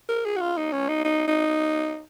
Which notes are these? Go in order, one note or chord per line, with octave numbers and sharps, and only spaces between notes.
A#4
G#4
F#4
F4
D#4
C#4
D#4
D#4
D#4